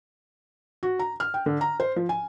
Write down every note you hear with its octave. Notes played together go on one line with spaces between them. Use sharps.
F#4
A#5
F6
G5
D3
A#5
C5
F3
G#5